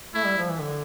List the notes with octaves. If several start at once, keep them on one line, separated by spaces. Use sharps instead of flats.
A3 E4
G3
F3
E3
D3